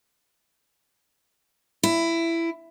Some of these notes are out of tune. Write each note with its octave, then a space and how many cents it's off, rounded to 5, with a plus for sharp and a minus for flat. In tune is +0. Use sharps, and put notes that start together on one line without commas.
E4 +15